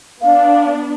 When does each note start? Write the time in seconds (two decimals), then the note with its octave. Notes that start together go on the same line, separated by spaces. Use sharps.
0.22 B3 D4 F5